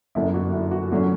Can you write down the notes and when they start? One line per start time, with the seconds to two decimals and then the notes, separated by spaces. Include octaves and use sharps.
0.15 G1 F#2 D3 E4
0.34 F#4
0.53 E4
0.71 F#4
0.91 E2 D3 F#3 A3 C#4 F#4